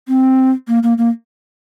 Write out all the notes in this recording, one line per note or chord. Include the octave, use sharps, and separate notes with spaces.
C4
A#3
A#3
A#3